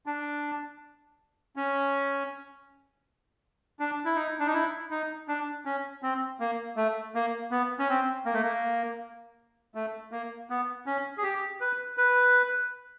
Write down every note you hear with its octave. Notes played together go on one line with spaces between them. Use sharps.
D4
C#4
D4
E4
D#4
D4
D#4
E4
D#4
D4
C#4
C4
A#3
A3
A#3
B3
C#4
C4
A#3
A3
A#3
A3
A#3
B3
C#4
G#4
G4
B4
B4